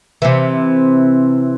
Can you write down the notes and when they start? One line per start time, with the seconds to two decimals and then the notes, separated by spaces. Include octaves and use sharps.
0.22 C3 E3